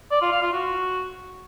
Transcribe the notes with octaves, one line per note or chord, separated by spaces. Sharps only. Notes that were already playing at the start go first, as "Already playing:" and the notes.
D5
F4
F5
F4
F#4